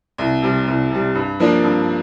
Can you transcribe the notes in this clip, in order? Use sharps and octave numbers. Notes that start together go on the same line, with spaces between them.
C2
C3 G3
C2
C3 G3
G2
F3 A#3 D4
G2